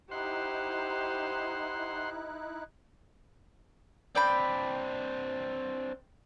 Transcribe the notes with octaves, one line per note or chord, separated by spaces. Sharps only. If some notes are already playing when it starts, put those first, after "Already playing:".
D#4 E4 G4 C5 F#5 C6 F#6
C4 D4 D5 G5 B5